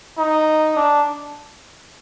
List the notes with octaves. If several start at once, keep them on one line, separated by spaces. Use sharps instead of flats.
D#4
D4